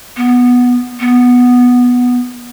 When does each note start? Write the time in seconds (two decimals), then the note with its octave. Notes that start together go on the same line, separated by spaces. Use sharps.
0.17 B3
1.00 B3